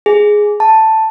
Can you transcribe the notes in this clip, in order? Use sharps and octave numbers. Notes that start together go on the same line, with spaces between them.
G#4
A5